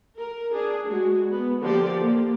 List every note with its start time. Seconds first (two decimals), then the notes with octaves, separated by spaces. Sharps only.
0.18 A#4
0.52 D4 G#4
0.88 G#3 F#4
1.30 B3
1.60 D3 F3 A#3 G4 D5
1.98 A#3